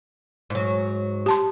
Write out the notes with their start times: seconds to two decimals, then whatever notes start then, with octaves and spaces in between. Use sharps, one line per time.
0.50 G#2 F#3
1.26 G4 A5 C6